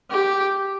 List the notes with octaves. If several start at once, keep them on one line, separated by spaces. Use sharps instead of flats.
G4